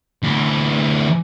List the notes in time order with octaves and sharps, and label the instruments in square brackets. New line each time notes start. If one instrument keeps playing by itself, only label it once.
[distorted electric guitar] D2 E3